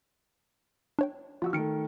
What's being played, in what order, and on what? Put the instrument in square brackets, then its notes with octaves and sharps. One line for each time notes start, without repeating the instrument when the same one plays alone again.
[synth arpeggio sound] D4 C#5 G5
[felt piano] F3 F#4 [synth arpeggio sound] F4 F#5 E6
[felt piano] D#3 A3 [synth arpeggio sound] F6 C#7 D7